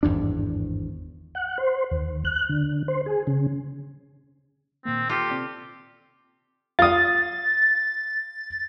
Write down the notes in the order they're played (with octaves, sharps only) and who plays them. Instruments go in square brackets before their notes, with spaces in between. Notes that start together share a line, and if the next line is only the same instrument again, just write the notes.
[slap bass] G#1 E2 G2 D4
[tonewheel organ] F#5
C5
D#2
F#6
D3
C5
G#4
C#3
[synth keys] A#2 D#3 A#3 [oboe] C4
[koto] F4 A4 [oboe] G4 [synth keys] A#6 C#7
[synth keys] C3 C4 D5
[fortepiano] F4 D#6 [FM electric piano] A6